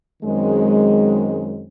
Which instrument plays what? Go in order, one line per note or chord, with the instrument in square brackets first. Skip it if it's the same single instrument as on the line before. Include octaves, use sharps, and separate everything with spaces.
[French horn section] F#2 D#3 G#3 C4